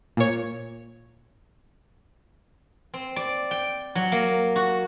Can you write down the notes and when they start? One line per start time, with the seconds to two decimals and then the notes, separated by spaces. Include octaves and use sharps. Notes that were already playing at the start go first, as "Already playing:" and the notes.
0.17 A#2 C#5
2.94 C4
3.16 D5
3.51 G5
3.95 F#3
4.12 A#3
4.56 F#4